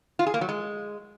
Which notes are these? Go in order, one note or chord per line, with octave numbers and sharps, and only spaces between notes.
F4
G#4
A#3
F#3
G#3